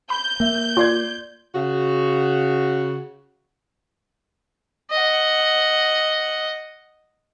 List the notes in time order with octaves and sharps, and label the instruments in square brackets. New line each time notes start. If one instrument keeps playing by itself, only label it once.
[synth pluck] B5 [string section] G6
[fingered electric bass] A#3 [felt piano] E5
[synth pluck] F4 [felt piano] D5 C6 G#6
[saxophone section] C#3 F#4
[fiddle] D#5 F#5